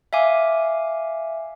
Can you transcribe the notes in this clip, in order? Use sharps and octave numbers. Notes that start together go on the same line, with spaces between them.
E5 F5 G#5 D6